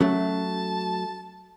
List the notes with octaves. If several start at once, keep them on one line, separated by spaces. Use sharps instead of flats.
F#3 A3 C#4 A5